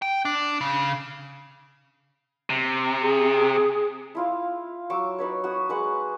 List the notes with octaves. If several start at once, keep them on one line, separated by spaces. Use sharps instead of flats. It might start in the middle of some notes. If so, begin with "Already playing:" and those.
G5
D4
C#3
C3
G#4
E4 F4 F5
F#3 C#6 D6 E6
D#4 B4 C#5
F#4 D#6
G#3 B4 F#5